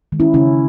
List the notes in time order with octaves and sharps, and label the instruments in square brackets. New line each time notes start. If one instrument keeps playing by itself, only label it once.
[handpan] D#3 G#3
C#4 E4
C#3 C#4 E4